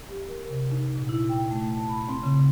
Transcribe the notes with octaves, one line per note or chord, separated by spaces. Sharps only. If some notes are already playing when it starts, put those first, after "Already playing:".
G4
A#4
C3
D#4
A#2
E4
G5
A3
A5
B5
C4
C#3